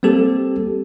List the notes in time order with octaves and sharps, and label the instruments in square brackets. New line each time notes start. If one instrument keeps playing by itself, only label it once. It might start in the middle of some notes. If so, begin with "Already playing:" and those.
[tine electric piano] G3 A#3 C4 G4 A4